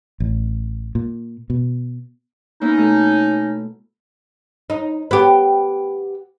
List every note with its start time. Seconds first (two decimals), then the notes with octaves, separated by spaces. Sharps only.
0.20 A1
0.95 A#2
1.50 B2
2.61 A#3 B3 C#4 D#4 E4
2.77 B2 A3 A4
4.70 D#4
5.11 B3 G4